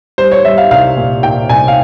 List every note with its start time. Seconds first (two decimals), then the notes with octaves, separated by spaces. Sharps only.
0.18 G3 C5
0.32 C#5
0.45 G3 E5
0.58 F5
0.71 C2 F5
0.97 A#2
1.23 A#2 G5
1.49 C2 G#5
1.68 F5